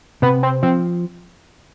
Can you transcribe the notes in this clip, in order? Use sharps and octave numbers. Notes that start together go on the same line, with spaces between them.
C3 B3
C4
F3 C4